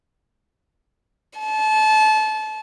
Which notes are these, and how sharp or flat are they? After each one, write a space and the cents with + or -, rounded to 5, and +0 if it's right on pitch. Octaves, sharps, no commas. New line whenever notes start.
A5 -30